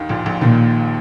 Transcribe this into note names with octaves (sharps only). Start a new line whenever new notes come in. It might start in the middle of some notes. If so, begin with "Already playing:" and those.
Already playing: D#2 D#3
A#1 A#2
A#1 A#2
D#2 A#2 D#3